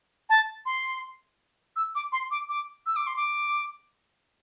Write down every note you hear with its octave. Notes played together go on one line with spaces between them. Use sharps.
A5
C6
E6
D6
C6
D6
D6
E6
D6
C6
D6